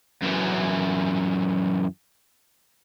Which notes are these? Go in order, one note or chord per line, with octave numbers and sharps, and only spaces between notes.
F#2 E3